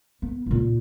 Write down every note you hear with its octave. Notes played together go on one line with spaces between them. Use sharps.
B3
D#2 A#2